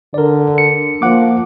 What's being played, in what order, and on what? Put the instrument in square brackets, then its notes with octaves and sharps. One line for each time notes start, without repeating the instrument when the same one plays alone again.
[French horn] D3 [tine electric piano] A#4 D5
[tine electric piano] C#7
[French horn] F3 [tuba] A#3 [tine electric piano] F#5 D6